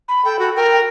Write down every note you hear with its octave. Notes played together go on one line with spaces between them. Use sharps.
B5
A4 G5
F#4 A4
A#4 G5